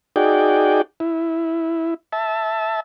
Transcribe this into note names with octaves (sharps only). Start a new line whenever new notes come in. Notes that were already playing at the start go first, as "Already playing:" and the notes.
D#4 F#4 G#4 D5 G5
E4
E5 A5